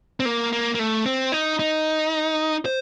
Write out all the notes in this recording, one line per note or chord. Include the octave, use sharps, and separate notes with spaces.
C4
A#3
A#3
A#3
A3
C4
D#4
D#4
C5